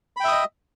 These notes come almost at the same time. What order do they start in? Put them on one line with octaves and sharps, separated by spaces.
B5 G5 E5 D#6 D#5